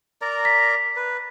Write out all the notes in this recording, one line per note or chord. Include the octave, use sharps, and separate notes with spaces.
A#4 D5 A#5
B6
B4